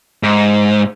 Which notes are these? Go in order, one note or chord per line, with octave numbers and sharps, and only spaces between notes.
G#2